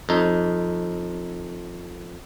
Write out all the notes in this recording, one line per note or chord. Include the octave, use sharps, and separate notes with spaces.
F2 D#4